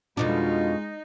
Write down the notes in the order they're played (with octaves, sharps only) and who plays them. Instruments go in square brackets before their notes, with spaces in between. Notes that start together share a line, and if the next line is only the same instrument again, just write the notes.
[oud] F2 B2 D4 [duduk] G#3 [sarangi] D#4 [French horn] F4